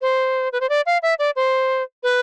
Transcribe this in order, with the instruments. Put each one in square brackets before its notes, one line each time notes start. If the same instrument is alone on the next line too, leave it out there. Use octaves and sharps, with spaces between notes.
[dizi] C5
B4
C5
D5
F5
E5
D5
C5
B4